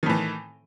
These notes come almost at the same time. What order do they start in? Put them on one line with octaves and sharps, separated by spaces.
D#3 A2 E3